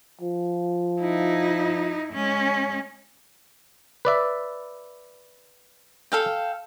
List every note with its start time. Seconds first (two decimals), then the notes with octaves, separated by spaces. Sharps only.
0.22 F3
1.01 D#4 E4
2.13 G#3 C#4
4.05 B4 D5 E5
6.12 A4 F5 G5